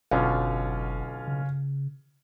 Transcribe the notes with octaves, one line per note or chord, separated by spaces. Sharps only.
F#1 B1 B2 D3 C#4 F4
C#3